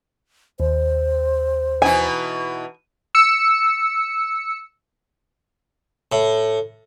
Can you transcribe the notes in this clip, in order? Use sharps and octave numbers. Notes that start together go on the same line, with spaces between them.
D#2 C5
B2 E3 D#4 G#5
E6 C#7
A2